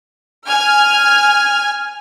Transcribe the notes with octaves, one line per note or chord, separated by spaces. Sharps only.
G#5 F6